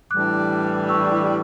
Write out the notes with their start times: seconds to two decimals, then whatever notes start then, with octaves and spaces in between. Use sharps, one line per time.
0.11 A2 E3 G3 D4 D6 F#6
0.89 C#6 E6